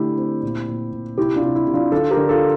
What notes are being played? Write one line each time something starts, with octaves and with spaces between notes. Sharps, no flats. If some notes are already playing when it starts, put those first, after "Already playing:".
Already playing: D3 A3 E4 G4
C4
A#2
A#2
A#2
C3 E4 G4
D4 F4
C3
E4
C3
D4 F4
D3 F4 A4
G4 A#4
D3
F4 A4